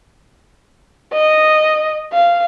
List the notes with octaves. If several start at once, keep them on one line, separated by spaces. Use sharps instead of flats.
D#5
F5